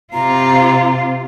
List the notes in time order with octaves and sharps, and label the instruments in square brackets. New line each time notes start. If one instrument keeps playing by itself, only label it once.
[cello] C3 F4 [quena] A#5